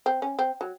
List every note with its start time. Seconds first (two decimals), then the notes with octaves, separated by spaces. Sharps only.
0.06 C4
0.22 C#4
0.39 C4
0.61 F#3